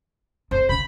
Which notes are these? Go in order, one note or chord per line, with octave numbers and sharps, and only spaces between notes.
F2 C5
C#3 B5